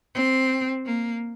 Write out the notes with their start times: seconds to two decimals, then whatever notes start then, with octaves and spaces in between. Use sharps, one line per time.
0.15 C4
0.86 A#3